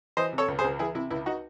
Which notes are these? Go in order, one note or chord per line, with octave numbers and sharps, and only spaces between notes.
E3 C5 D#5
C3
A4 C#5
C#2
G#4 C5
C#2
E3 E4 G#4
C3 E4
C#2 E4
D#4 F#4